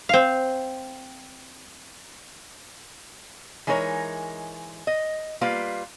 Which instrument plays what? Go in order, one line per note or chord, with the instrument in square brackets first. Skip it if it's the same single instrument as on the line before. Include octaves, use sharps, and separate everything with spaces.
[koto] C4 F5
[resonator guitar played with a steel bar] E3 G#3 D#4 A#4 C#5
D#5
G3 A#3 F4 B4 F5